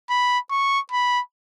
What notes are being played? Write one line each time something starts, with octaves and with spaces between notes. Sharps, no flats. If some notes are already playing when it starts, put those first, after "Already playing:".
B5
C#6
B5